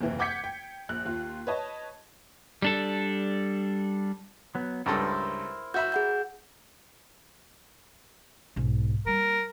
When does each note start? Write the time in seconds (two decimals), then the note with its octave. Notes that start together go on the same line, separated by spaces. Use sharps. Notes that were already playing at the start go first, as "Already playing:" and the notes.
0.01 F#1 D#2 C3 E3
0.19 F#5 D6 G6 G#6 B6 C#7
0.44 G5
0.89 A#1 F#6
1.05 D#2 F4
1.47 B4 C#5 D#5 A5
2.62 G3 D4 A4
4.55 F#3 B3
4.86 C#2 G2 E4 A4 A#4 C5
5.74 F#4 E5 B5 G6
5.92 G#4 F#5 G6
8.56 B1 G#2
9.06 G3 A#3 A#4